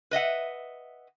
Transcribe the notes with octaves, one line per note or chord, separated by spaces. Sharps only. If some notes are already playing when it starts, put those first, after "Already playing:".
B4 D#5 E5 F#5